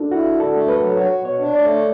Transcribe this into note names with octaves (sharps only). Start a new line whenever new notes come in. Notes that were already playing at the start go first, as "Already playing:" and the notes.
Already playing: D4 F#4 A4
E4 F#4
D3
A4
A3
B4
F#3
F#4 C#5
B2
C#5
D4
D5
A3